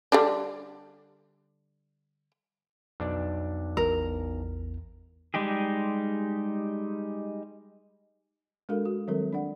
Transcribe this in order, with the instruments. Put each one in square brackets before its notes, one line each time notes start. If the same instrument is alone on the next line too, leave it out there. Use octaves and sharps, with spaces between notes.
[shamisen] D3 G3 D4
[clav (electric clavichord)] B1 D4 D5 [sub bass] F2
[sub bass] A1 [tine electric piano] E2 [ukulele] A#4
[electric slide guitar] G3 G#3 D#4 G4 G#4
[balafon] G#3 D4 F#4 A4 A#4 F5
F#4
D#3 F#3 G3 C4 A4 A#4
D4 D5 F#5